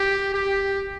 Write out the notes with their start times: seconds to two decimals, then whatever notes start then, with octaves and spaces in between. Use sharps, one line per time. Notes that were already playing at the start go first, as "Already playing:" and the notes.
Already playing: G4
0.34 G4